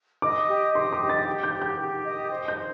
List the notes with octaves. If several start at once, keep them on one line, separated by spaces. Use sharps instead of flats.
D#5 D6
G4
D#5 C6
D6
G4
A6
G4
G6
G4
G6
G4
D#5
C5
G6
C5